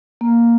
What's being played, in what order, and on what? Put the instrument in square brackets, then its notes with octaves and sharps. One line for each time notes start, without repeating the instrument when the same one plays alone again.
[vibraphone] A#3